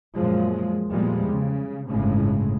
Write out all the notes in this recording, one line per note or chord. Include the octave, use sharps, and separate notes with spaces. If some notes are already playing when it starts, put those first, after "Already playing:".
F#2 A#2 F3 G#3
E2 A#2 F3 G3 G#3
C#3
G1 A2 C#3 G#3